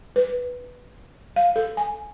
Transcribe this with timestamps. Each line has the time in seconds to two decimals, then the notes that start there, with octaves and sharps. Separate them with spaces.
0.16 B4
1.36 F5
1.56 A4
1.77 G#5